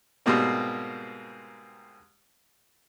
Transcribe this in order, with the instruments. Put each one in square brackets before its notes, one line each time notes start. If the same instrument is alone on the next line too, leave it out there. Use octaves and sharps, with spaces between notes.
[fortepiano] G#2 B2 G3 A#3 C4